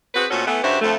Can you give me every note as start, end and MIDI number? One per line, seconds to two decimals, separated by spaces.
0.15 0.25 60
0.15 0.25 66
0.15 0.25 68
0.15 0.25 71
0.30 0.43 46
0.30 0.43 57
0.30 0.43 60
0.30 0.43 61
0.30 0.43 66
0.30 0.43 69
0.46 0.62 52
0.46 0.62 57
0.46 0.62 59
0.64 0.78 43
0.64 0.78 49
0.64 0.78 66
0.64 0.78 67
0.64 0.78 72
0.64 0.78 76
0.82 0.95 41
0.82 0.95 50
0.82 0.95 53
0.82 0.95 57